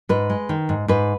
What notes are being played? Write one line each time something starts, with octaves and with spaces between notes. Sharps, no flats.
G#2 B4
G#3
D#3
G#2
G#2 B4